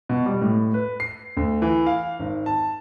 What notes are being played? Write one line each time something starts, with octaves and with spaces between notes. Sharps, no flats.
B2
G3
A2
B4
C7
D2
E3
F5
G#1
A5